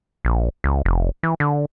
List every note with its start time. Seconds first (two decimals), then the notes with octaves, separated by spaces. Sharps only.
0.25 A#1
0.64 C#2
0.85 F1
1.23 E3
1.40 D3